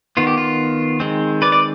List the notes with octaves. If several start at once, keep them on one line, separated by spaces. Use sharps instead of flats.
D#3 B3 F4
G4
F4
D#3 G#3 C4
B4 D5
D5